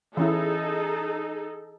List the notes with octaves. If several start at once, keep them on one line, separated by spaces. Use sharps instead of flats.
E3 C#4 D#4 E4 G#4 A4